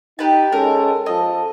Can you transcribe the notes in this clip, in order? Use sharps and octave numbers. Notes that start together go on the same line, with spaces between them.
D#4 G4 B4 A5
G#3 C#4 A4 A#4
F3 A4 D#5